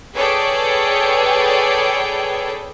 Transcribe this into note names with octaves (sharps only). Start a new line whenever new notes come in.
G#4 A4 B4 C#5 D5 G5